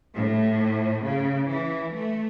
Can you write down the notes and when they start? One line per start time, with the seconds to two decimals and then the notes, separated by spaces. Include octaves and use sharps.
0.14 A2
1.05 C#3
1.49 E3
1.94 A3